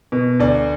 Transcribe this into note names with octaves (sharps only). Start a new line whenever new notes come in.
B2
D2 D5